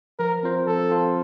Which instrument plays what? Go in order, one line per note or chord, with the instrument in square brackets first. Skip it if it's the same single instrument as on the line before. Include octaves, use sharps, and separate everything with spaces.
[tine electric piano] F3 [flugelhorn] A#4
[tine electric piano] C4 F4 C5
[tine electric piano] F3 [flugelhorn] A4
[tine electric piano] C4 F4 C5